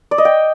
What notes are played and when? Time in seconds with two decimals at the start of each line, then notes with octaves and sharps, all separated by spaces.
0.11 D5
0.18 D#5
0.25 G5